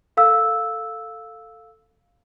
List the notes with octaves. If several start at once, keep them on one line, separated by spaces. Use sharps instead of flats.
A4 F5 E6